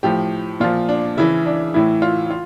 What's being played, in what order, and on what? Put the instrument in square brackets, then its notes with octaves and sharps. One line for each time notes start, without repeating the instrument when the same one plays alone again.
[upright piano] A2 F3 G4
A#2 F3 F4
D4
C#3 E3 E4
D4
A2 E3 E4
F4
F4